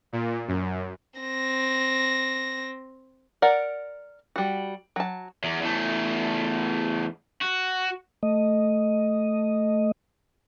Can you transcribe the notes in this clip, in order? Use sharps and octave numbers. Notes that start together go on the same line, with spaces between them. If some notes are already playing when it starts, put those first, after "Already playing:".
A#2
F#2
C4 A#6
A#4 D5 F#5
G3 F#4
F#3 A5
E2
E2 A3
F#4
A3 D#5